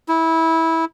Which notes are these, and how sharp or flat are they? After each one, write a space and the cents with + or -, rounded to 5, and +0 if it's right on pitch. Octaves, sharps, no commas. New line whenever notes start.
E4 -20